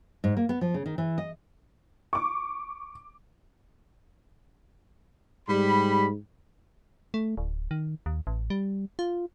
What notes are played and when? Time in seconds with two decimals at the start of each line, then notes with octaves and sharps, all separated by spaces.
0.24 G#2
0.37 A#3
0.49 B3
0.61 F3
0.74 C#3
0.86 D#3
0.98 E3
1.18 D#5
2.13 C#6 D6
5.49 G#2 G3 B5
7.14 A3
7.37 D1
7.71 D#3
8.06 D#2
8.27 A1
8.50 G3
8.99 F4